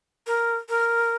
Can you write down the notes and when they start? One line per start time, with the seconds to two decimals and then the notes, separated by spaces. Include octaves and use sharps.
0.27 A#4
0.69 A#4